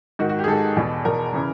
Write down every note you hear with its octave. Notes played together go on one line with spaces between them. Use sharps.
G#2 D#3 F#4
F#4
G4
G#4
G#2 D#3 A4
E2 B2
E2 B2 A#4
C#3 E3